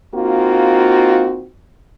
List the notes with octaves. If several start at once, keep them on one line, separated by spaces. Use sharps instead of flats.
A#3 C4 D#4 F4 F#4